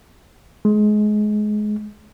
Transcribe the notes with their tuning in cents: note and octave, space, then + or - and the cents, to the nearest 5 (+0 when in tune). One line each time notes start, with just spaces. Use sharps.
G#3 +25